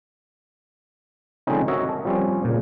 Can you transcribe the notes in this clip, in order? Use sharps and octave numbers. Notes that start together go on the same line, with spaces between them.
D3 F3 G#3 C4 C#4 D#4
F#4 A#4 C#5 D#5 E5
A5
F3 G3 C4 C#4
A#2 C#3